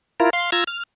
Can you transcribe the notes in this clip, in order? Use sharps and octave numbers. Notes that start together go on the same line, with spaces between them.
E4 F4 A#4
F5 C6
F4 A#5 E6 G#6
F6